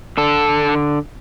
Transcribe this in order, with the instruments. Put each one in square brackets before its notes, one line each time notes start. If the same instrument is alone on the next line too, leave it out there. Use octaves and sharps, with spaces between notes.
[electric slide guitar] D3 A4